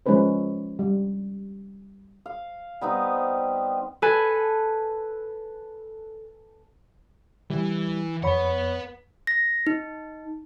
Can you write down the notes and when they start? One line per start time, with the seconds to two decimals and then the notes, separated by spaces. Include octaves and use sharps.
0.06 F3 G#3 C#4 D#4 B4 C5
0.79 G3
2.26 F5
2.81 G3 B3 C4 D#4
4.02 A4 B4 G#5
7.50 E3 G3
8.23 F2 B4 C#5 F#5 B5
9.27 A#6
9.67 D#4